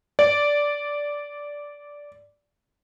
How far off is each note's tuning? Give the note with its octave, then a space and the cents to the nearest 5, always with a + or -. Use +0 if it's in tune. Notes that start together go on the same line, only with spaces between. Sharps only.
D5 -10